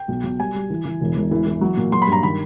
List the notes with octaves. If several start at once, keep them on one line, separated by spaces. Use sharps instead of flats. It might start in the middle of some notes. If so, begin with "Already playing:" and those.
Already playing: G5
B1
B1
G3 G#5
G3
E3
E3
E1
E1
E3
E3
F#3
A#2
F#3 C6
B5
G2
A#5
D#3 B5